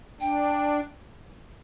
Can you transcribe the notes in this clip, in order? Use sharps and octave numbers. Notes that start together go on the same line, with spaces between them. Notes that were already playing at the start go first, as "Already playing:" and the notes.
D4 G5